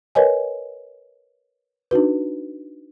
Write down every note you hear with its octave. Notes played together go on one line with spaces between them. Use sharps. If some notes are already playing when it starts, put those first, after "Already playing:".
A#4 B4 C#5 D#5 G#5
D4 D#4 F#4 B4